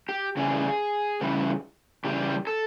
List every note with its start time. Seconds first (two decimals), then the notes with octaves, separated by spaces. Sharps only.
0.09 G4
0.37 C#3 E3 G3 G#4
1.21 C#3 E3 G3
2.04 C#3 E3 G3 G4
2.47 A4